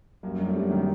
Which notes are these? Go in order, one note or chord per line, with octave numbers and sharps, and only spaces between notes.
F#2 G3 A#3
F#2 D4
A3 C4
G3
D#3 F#3 A3